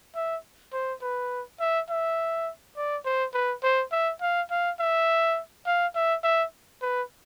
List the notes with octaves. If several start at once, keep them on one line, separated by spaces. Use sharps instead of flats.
E5
C5
B4
E5
E5
D5
C5
B4
C5
E5
F5
F5
E5
F5
E5
E5
B4